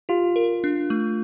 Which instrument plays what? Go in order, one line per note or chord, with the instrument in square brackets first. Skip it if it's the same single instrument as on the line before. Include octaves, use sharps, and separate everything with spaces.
[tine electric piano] F4 [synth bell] G4
[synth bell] A#4
D4
A3